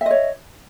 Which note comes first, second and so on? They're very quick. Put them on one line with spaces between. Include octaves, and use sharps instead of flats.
E5 D#5 C#5